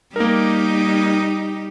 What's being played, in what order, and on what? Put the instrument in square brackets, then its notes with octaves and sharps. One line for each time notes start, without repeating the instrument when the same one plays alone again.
[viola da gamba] G3 D#4 G4 [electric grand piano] A#3 A#4